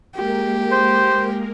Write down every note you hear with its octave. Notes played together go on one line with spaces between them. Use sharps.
G#3 A#3 G4 A#4
C5